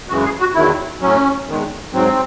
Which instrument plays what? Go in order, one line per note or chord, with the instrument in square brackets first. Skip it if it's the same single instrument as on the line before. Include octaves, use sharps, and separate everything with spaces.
[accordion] F#2 C#3 E3 G#3 F#4
G#4
F#4
E2 D#3 F#3 E4
A2 F#3 C#4
E2 D#3 G#3
G#2 F#3 C4